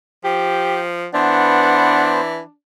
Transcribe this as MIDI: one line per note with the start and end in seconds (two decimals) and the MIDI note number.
0.24 1.06 53
0.24 0.81 67
1.14 2.40 52
1.14 2.21 59
1.14 2.53 62
1.14 2.21 72
1.14 2.13 78